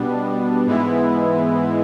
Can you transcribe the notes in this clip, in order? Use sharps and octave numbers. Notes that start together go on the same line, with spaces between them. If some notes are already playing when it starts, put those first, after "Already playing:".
Already playing: B2 G3 B3 D4
G#2 E3 G#3 B3 E4